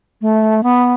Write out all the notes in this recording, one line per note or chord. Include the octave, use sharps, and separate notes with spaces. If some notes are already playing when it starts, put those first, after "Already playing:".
A3
B3